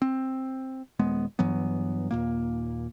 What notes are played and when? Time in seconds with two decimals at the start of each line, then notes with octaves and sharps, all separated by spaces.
0.02 C4
0.99 D#1 G#3 B3
1.39 G2 E3 F#3 B3
2.11 D#2 A#2 A#3